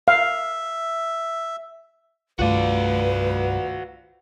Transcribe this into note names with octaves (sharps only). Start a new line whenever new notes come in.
E5 F5
C2 G2 A3 F4 F#4 B4 D5 F5